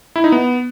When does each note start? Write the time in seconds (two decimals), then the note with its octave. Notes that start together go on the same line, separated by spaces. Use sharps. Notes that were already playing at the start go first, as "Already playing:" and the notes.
0.16 E4
0.24 D#4
0.32 B3